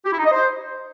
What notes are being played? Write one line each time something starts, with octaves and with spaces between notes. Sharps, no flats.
G4
E4
D#4
D#5
C5